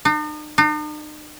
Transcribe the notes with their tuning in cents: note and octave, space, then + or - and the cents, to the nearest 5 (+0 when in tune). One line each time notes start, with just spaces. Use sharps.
D#4 -45
D#4 -45